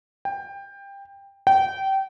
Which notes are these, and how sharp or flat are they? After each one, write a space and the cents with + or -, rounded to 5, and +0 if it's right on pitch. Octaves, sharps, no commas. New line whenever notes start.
G5 +20
G5 -25